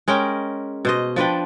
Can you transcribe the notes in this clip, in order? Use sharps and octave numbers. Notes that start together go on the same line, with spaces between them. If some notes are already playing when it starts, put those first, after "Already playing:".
G#3 C#4 A#4 G5
B2 C5 D#5
F3 D4 B4 G5